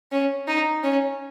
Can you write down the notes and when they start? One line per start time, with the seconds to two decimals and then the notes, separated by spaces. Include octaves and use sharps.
0.12 C#4
0.47 D#4
0.83 C#4